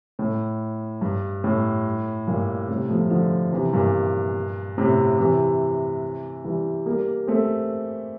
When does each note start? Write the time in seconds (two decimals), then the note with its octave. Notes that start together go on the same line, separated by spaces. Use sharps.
0.19 A2
1.01 G2
1.44 A2
2.27 G2 A#2
2.69 A2 C3
2.90 F3 A3
3.11 D3 F3
3.52 C3 E3
3.73 G2 A#2
4.78 A2 C3
5.19 C3 E3
6.44 E3 G3
6.86 G3 A#3
7.27 A3 C4